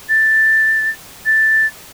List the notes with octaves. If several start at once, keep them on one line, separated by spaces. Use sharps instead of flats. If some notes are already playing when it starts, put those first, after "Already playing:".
A6
A6